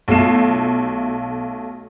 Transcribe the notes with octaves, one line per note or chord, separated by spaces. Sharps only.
B1 B2 A3 F4 C7 E7